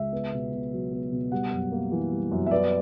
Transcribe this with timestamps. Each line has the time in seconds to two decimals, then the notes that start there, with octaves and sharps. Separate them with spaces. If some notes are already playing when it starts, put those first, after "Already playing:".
Already playing: C#2 E5
0.13 B3
0.33 B2
0.53 B2
0.72 F#3
0.92 B3
1.12 B2
1.32 G3 F#5
1.52 F#2
1.72 A#3
1.92 E3
2.12 G3
2.31 F#2
2.46 E5
2.51 B3 D5